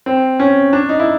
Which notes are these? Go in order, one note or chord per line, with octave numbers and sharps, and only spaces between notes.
C4
C#4
D4
D#4
E4